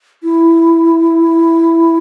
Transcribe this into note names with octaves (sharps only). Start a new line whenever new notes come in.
E4